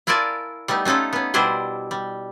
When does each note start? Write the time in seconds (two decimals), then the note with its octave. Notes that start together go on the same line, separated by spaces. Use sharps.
0.07 E4 F4 A#4 D5 G#5 A5
0.68 G3 A3 B3 D#4
0.85 A3 C#4 D#4 F4 A4
1.13 B3 C#4
1.34 B2 G3 D4 E4 C5 G#5
1.91 G3